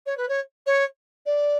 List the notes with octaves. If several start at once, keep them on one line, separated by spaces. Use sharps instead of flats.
C#5
B4
C#5
C#5
D5